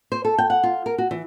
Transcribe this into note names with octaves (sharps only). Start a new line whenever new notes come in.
C5
A4
G5
F#5
F4
A#4
F#4
E3